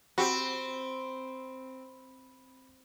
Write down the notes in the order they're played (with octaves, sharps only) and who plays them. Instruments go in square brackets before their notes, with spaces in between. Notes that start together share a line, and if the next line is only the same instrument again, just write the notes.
[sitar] C4 [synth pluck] F#4 G4 [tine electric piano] B5